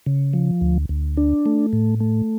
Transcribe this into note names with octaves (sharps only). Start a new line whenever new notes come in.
C#3
F3
D2
D2
D4
A3
A2
A3